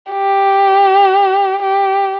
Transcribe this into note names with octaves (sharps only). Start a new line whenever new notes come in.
G4
G4